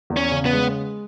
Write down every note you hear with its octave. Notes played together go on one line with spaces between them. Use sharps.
E2
C#4
C#3
B3
G#3